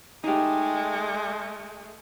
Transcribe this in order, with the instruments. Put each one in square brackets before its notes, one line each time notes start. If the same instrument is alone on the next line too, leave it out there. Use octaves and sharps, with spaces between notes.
[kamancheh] G#3 A3 [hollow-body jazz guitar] D#4 G4